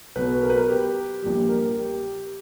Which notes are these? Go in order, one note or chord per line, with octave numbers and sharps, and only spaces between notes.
B1 B2 F#3 B4
A#4
B4
A#4
G4
A#1 A#2 G3 G4
A#4
G4